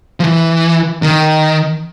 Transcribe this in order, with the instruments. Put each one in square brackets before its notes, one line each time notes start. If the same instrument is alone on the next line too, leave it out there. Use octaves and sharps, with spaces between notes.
[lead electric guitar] F3
E3
D#3